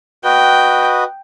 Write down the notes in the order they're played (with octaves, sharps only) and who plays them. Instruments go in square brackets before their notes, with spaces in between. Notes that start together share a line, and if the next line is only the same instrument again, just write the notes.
[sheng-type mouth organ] F#4 B4 D#5 [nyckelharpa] G5